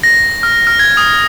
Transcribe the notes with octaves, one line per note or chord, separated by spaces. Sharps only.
A#6
F6
F6
G#6
D#6